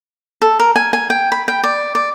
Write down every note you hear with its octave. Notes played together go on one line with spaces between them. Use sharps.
A4
A#4
G#5
G#5
G5
B5
G5
D5
D5